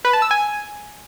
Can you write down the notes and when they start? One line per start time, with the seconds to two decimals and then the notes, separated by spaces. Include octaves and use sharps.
0.05 B4
0.13 A5
0.22 E6
0.31 G#5